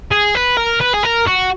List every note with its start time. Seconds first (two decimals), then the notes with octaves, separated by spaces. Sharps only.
0.11 G#4
0.35 B4
0.57 A#4
0.80 B4
0.93 G#4
1.03 A#4
1.27 F#4